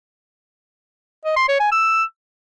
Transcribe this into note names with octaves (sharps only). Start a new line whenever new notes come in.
D#5
C6
C#5
G#5
E6